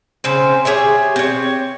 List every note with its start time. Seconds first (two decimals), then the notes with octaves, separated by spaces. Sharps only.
0.24 C#3 C4 C5
0.65 G4 G#4 C#5 E5
1.16 C4 C#5